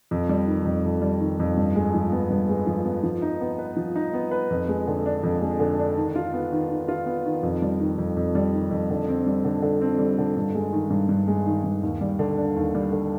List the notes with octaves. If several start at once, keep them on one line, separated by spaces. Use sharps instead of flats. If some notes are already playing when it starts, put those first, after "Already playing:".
F2
G3
D#3
F2
F2
G3
D#3
F2
G2
G#3
F3
B3
G2
G#3
F3
B3
F3
D#4
B3
B4
F3
D#4
B3
B4
F2
G#3
D3
D4
F2
G#3
D3
D4
D#3
F4
B3
D#3
D#3
F4
B3
D#3
F2
G3
D#3
F2
F2
G3
D#3
F2
D3
C4
G3
D3
D3
C4
G3
D3
G2
G#3
D#3
G2
G2
G#3
D#3
G2
D#2
G3
D3
D4
D#2
G3
D3